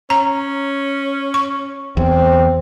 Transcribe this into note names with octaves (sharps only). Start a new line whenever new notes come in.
C#4 A#5
C#6
E2 C4